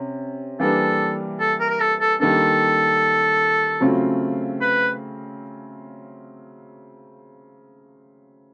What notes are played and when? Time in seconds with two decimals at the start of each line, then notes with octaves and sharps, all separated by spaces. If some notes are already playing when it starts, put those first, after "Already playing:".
Already playing: C3 C#4
0.60 E3 G3 A#3 D4 A4
1.40 A4
1.60 A#4
1.70 A#4
1.80 A4
2.01 A4
2.20 D#3 G3 A#3 D4 A4
3.81 C#3 F#3 A3 C4 F4
4.61 B4